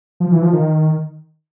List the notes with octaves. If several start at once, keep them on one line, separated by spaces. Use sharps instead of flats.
F3
E3
F3
D#3